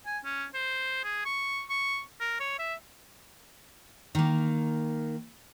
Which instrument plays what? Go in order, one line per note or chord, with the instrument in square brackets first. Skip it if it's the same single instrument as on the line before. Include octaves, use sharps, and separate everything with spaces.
[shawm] G#5
C#4
C5
G#4
C#6
C#6
A#4
C#5
E5
[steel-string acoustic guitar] D#3 A#3